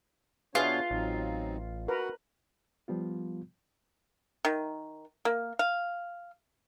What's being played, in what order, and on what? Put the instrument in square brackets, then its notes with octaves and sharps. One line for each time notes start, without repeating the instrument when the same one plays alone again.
[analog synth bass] B2 [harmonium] B3 D4 C#5 [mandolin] F4 [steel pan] G#4 B4
[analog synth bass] A1 [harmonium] F#3 C4 D#4
[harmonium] F#4 F#5 [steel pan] A#4 B4
[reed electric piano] F3 G3 B3 F4
[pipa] D#3
A#3
F5